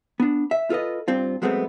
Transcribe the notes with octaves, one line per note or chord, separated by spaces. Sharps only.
B3 D4
E5
F4 A4 B4 D#5
G2 C4 F4
F#3 G#3 A3 B3 C4